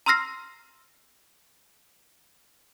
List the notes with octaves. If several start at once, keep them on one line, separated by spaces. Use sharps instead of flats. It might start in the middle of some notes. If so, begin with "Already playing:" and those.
A#5 C6 E6 F6 A#6 C7